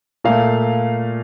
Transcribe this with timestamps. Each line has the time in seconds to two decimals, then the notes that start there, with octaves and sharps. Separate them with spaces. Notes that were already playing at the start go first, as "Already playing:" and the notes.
0.24 A#2 A3 F5